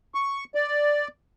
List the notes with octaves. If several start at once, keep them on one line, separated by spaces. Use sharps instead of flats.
C#6
D5